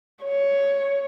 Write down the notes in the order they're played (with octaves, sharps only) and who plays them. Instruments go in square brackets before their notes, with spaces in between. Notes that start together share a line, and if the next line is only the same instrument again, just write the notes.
[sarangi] C#5